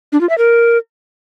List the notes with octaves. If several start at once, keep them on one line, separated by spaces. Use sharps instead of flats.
D4
F4
E5
A#4